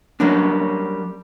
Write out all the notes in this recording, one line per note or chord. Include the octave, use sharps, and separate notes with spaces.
F#3 G3 A#3 C#4 D4